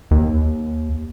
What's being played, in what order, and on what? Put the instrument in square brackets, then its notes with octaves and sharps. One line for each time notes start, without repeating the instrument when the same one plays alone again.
[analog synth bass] D#2